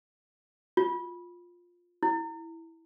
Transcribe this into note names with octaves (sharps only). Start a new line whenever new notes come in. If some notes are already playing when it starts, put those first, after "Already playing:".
F4
E4